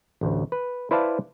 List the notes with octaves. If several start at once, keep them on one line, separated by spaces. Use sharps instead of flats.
A1 D2
B4
E4 B4 C5 D5 F5 A5